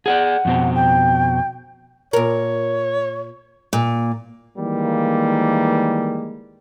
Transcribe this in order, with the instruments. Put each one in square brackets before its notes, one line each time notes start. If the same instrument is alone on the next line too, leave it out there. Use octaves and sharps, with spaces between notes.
[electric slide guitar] G#4 C#5 D5 [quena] F#5
[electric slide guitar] F2 B2 C4
[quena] G5
[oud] A#2 A#4 [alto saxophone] C#5
[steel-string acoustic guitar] A#2
[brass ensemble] D#3 E3 G3 G#3 A#3